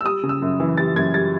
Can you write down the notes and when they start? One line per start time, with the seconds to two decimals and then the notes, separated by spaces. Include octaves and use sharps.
0.01 E6
0.04 G3 D#6
0.23 C#3
0.29 E6
0.42 F#2
0.60 E3
0.77 G3 A6
0.96 F#2 G#6
1.14 G3 A6